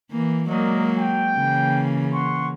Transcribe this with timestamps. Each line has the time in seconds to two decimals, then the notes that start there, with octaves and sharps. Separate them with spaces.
0.12 E3 A#3
0.48 F#3 G#3 A#3 A#4 D5 D#5
0.98 G5
1.36 C#3 E3 A#3
2.14 F#5 C6 C#6